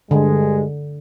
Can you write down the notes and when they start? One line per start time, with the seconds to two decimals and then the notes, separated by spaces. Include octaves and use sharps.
0.11 G2 D3 G#3